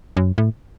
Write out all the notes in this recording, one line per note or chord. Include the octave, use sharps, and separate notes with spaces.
F#2
A2